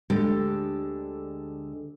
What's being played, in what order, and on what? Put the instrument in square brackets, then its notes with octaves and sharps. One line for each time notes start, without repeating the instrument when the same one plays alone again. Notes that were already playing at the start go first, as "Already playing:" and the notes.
[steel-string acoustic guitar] D2 D3 G#3 G4 A4